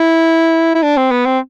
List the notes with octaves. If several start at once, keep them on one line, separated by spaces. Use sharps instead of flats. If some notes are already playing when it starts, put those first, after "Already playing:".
Already playing: E4
E4
D4
C4
B3
C4